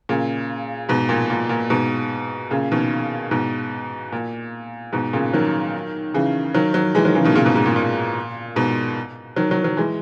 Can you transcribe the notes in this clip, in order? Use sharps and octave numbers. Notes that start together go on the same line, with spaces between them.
A#2 C#3
G#2 B2
A#2
A#2
A#2
G#2 B2
A#2 C#3
B2 D#3
G#2 B2
A#2
G#2 B2
A#2 C#3
D#3 F#3
C#3 E3
D#3 F#3
D#3 F#3
E3 G#3
D#3 F#3
C#3 E3
B2 D#3
A#2 C#3
G#2 B2
G#2
A#2
A#2
G#2 B2
D#3 F#3
D#3 F#3
D#3 F#3
E3 G#3